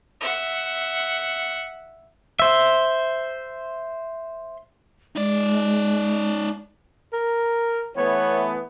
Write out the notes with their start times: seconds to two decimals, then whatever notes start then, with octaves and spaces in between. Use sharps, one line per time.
0.21 E5 F#5
2.39 C5 E5
5.16 G#3 D#4 D5
7.13 A#4
7.96 E3 A3 B3 C#5